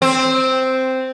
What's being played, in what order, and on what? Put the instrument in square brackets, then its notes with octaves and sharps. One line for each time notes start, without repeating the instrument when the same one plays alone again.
[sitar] C4